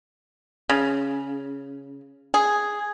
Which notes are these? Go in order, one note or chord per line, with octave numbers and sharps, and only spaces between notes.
C#3
G#4